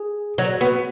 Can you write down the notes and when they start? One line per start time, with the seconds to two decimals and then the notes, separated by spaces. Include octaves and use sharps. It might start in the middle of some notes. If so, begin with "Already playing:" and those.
Already playing: G#4
0.38 F#3 F#4
0.61 B3 F#4